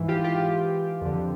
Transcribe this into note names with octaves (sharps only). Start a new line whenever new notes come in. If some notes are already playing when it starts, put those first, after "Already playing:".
Already playing: G#2 E3
F4 G4
F4 G4
F2 D3